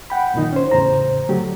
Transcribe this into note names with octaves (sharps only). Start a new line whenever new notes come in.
F#5 G5 B5
F#2 A#2 D3 D#3 D#4
C#4 C5
E2 A2 C#3 C5 A#5
D3 F#3 A3 G4